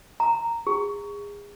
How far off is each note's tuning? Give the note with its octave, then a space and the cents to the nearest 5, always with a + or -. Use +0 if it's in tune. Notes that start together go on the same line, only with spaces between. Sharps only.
A#5 -10
G#4 -30